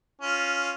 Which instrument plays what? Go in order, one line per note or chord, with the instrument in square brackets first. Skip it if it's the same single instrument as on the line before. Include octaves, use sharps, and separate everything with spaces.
[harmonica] C#4 F4